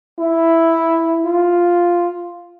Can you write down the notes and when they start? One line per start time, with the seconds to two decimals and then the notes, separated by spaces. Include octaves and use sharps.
0.19 E4
1.25 F4